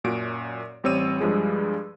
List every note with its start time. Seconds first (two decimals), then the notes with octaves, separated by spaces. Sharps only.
0.04 F#2 A#2 F#4 D7
0.84 A1 G3 C4 C#5 E6 D#7
1.20 G2 F3 G3 G#3 G#4